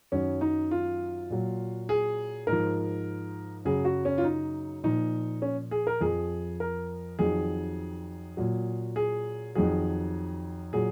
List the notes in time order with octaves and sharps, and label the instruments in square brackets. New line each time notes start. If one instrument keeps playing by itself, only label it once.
[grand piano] F#2 D#3 F#3 C#4
D#4
F4
A#2 F#3
G#4
G#2 F3 A#4
F#2 C#3 F#3 G#4
F#4
C#4
F4
D#4
A#2 F3 D#4
C#4
G#4
A#4
F2 F3 G#4
A#4
F2 D#3 F#3 G#4
A#2 F#3
G#4
F2 D#3 F#3 G#4
A#2 F#3 G#4